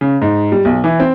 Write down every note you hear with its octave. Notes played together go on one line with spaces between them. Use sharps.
C#3
G#2
G3
B1
E3
C4